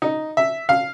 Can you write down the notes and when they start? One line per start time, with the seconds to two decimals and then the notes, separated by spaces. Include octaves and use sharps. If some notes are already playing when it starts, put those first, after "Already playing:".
0.02 D#4
0.37 E5
0.69 F5